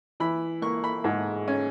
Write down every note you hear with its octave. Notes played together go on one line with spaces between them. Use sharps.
E3 B5
A#3 C#6
B5
G#2
C#4